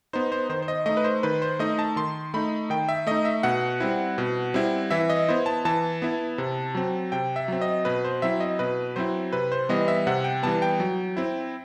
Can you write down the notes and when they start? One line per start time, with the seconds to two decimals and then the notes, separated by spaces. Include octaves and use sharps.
0.13 B3 D#4 C5
0.32 C5
0.49 D#3 C5
0.62 C5
0.68 D#5
0.86 A3 D#4 D#5
0.97 B4
1.04 C5
1.23 D#3 B4
1.42 C5
1.59 A3 D#4 D#5
1.79 A5
1.96 D#3 C6
2.34 A3 D#4 B5
2.70 D#3 G5
2.89 E5
3.07 A3 D#4 D#5
3.25 E5
3.43 B2 F#5
3.80 G3 C4 E4
4.18 B2
4.54 G3 C4 E4
4.91 E3 E5
5.10 D#5
5.29 B3 E4 C5
5.46 A5
5.65 E3 A5
6.02 B3 E4
6.38 C3
6.75 F#3 C4
7.12 C3 G5
7.36 E5
7.48 F#3 C4
7.62 D#5
7.85 B2 B4
8.05 C5
8.22 F#3 C4 E4 E5
8.40 D#5
8.59 B2 B4
8.96 F#3 C4 E4 C5
9.33 C3 B4
9.52 C5
9.69 E3 G3 B3 D#5
9.88 E5
10.07 C3 F#5
10.24 G5
10.43 E3 G3 B3 A5
10.62 G5
10.80 F#3
11.17 C4 E4